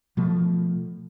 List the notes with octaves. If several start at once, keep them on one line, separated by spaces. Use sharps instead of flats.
B2 F3 A3